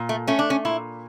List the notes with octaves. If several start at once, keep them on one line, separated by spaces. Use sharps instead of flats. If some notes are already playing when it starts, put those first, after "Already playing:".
Already playing: A#2
A3
A3 C#4
D4
C#4
A#2 E4